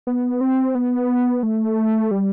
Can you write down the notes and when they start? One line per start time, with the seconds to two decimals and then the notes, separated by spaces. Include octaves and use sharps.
0.07 B3
0.41 C4
0.75 B3
1.43 A3
2.11 G3